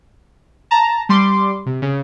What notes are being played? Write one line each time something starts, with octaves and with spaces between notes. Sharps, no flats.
A5 A#5
G3 C6 D6
C3
C#3